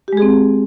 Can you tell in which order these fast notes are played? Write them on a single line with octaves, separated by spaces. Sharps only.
G4 G#3 G#4 C4